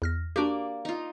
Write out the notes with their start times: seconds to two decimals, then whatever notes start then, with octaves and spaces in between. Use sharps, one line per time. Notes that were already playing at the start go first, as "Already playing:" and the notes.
0.02 E2 F6 A#6
0.36 A#3 D4 F#4 G4 D5
0.85 D#4 F4